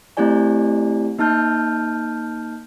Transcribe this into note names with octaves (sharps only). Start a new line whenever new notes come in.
A3 C4 E4 G4 D5 G#5
A#3 D#4 A5 F6 G6